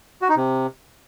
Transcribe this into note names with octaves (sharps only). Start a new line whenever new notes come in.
F#4
D#4
C3